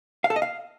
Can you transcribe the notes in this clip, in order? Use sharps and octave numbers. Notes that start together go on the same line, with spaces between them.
F5
A4
D#5
F5